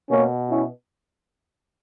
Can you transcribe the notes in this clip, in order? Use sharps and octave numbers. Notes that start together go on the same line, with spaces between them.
B2 A#3 C#4
C#4 E4